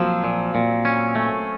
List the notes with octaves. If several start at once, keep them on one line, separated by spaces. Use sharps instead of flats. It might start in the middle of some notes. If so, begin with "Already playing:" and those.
Already playing: F3 F#3 A#3 C4
A#2
A#2
C#4
A3